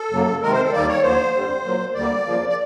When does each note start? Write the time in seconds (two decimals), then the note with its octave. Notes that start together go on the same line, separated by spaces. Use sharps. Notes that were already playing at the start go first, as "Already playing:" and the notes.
Already playing: A4
0.11 F#2 C#3 F#3 A#3
0.42 C3 D#3 G#3 A#4
0.53 C5
0.63 A4
0.73 D#2 D#3 G3 A#3 D5
0.88 C#5
1.03 D#2 D3 F3 C5
1.34 F2 D3 G3
1.64 A#2 F#3 A#3
1.94 D2 D3 G3 A#3 D5
2.25 F2 C#3 F3 A#3
2.49 D5